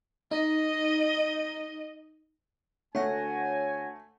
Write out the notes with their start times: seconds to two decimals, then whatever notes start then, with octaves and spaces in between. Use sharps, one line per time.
0.31 D#4 D#5
2.95 D2 A3 C#5 F#5 G#5 A#6